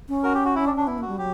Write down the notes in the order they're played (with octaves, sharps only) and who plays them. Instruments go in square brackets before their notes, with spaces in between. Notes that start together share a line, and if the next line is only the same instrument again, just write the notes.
[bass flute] C#4
[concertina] F#4 A#4
G4
F#4
E4
D4
D4
[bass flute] B3 [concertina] E4
[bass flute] A#3 [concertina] F#4
[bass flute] G3
[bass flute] F#3 [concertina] G4